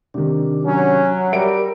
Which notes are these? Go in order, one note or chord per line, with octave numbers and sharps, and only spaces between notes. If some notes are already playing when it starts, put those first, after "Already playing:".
C3 D#3 D4
F#3 C#4
G3 A#4 E5 D7